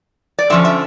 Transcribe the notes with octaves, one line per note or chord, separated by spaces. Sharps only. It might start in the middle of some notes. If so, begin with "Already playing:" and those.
D5
D3 F3 C#4 E5
E5